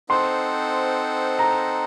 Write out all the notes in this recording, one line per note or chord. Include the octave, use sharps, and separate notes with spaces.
C4 D#4 A4 C5 F#5 C6
A#5